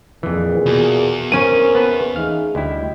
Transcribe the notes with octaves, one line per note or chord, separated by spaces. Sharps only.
F2 A#2 E3 G#4
E2 B2
C4 C#4 A#4 C5 D#7
B3 B4 A5
A3 D#4 G#4 F5
D2 G3 E4 D#5 G5